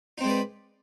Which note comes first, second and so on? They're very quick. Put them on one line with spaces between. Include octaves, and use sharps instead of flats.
D#4 C4 G#3 D5 B4